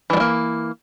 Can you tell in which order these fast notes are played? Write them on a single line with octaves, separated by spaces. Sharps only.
E3 G#3 G3 A#3